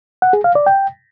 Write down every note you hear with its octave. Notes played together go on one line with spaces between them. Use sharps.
F#5
G#4
F5
D5
G5